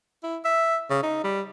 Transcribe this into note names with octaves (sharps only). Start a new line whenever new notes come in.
E4
E5
C#3
D#4
G3